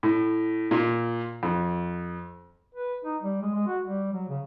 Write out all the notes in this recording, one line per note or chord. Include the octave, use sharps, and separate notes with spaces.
A2
A#2
F2
B4
D#4
G3
G#3
G#3
F#4
G3
F#3
C#3